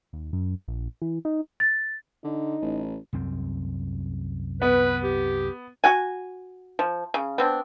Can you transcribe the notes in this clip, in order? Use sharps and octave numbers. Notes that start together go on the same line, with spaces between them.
D#2
F#2
A#1
E3
D#4
A6
D3 D#4
A1
C2 F#2 C4
B3 B4
G4
F#4 F#5 G#5
F3
C#3
B3 C4 D4